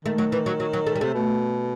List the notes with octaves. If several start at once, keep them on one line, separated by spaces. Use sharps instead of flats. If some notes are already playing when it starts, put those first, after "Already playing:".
D#3 A3
F#3
E3
F#3
F#3
F#3
A3
G3
C3 A3
B2